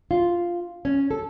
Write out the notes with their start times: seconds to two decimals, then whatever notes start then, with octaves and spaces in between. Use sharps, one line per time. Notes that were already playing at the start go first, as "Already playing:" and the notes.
0.11 F4
0.85 C#4
1.11 A4